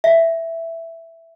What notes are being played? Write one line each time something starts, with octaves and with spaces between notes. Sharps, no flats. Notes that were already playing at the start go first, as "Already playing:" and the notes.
E5